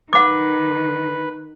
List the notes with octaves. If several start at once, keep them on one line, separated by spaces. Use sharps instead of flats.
D#3 B4 F#5 D6